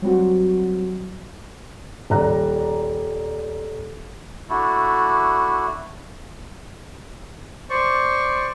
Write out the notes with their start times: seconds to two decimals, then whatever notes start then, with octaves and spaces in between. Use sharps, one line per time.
0.02 F#3 G3 C4 F#4
2.10 D#1 D5 A#5 F#6
4.49 A3 D4 E4 F#4
7.70 C5 D5 C#6